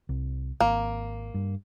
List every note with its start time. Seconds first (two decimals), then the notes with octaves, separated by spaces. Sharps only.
0.09 C2
0.60 G#1 A#3
1.34 G2